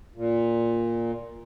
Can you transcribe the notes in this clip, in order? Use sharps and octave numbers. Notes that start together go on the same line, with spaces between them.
A#2